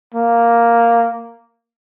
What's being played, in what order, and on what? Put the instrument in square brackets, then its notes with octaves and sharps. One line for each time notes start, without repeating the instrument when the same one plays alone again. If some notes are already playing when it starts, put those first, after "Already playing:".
[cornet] A#3